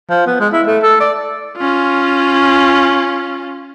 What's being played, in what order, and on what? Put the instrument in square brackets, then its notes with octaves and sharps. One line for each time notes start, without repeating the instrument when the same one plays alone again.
[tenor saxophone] F3
B3
G#3
E4
A3
A4
D5
[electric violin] C#4 F4